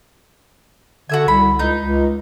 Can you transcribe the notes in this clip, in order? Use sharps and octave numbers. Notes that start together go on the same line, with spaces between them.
D3 F#4 E5 G#5
C2 B5
C#2 D#4
C#2